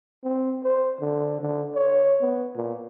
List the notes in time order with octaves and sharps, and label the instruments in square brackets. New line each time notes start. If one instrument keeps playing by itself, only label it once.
[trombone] C4
C5
D3
D3
C#5
B3
A#2